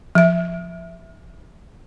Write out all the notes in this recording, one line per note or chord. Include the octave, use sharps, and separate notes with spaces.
F3 E5